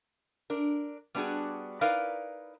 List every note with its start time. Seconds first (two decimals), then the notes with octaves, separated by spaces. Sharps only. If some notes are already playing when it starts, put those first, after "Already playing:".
0.50 D4 A#4
1.15 G3 B3 D4 D#4 F#4 G#4
1.81 D#4 E4 A#4 B4 D5 F5